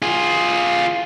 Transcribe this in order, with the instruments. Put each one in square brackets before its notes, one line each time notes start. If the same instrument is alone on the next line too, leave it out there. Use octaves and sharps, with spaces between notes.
[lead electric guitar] F4 G#4